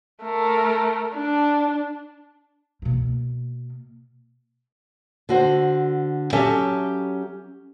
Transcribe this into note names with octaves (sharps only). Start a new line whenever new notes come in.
A3 A#4
D4
B2 A#3
D3 F#4 C5
F#3 C#4 G4 A4 E5 A5